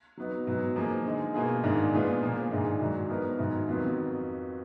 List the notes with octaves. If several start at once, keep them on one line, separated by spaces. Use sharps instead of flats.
F#3 B3 D#4
G#2 F#3 B3
F3 A#3 D#4 G#4
D3 G#3 D#4 G#4
B2 A#3 F4 G#4
G#2 D#3 A#3 D4 G#4
A#2 G#3 B3 F4 G#4
A#2 F3 A#3
G#2 D#3 G#3 D4
G#2 D#3 F#3
F3 B3 D#4 A#4
G#2 D#3 F#3
F2 D#3 F#3 B3 F4